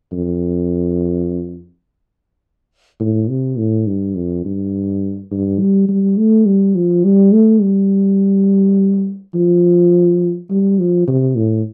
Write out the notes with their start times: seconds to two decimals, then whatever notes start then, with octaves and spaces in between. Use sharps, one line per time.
0.13 F2
3.00 A2
3.29 C3
3.58 A2
3.87 G2
4.16 F2
4.45 G2
5.31 G2
5.60 G3
5.89 G3
6.18 A3
6.46 G3
6.75 F3
7.04 G3
7.33 A3
7.62 G3
9.35 F3
10.50 G3
10.79 F3
11.08 C3
11.36 A2